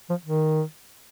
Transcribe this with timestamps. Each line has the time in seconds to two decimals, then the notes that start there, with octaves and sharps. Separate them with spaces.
0.09 F3
0.26 D#3